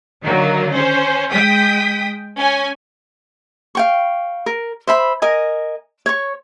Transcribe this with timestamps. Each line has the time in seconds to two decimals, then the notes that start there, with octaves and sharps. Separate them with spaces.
0.24 D3 D#3 F#3 A#3
0.71 C#4 C5
1.31 G#3 G5 D#6 B6
2.38 C#4 G#5
3.75 F5 G5 C#6
4.46 A#4
4.87 C5 E5 B5
5.22 A#4 D#5 G#5
6.06 C#5 C#6